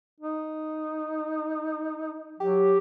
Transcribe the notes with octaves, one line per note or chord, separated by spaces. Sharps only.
D#4
F#3 G4